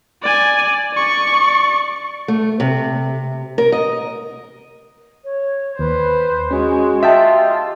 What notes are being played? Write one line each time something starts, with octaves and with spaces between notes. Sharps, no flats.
D5 G#5
D5 C#6
A3
C3
A#4
D#5
C#5
D#2 B4 C5
G#3 C#4 F#4
F4 D#5 E5 G5 A5
G4